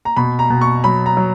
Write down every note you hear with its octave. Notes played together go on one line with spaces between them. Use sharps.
A#5
B2 B5
A#5
B2
C#6
F#3 B5
A#5
F#3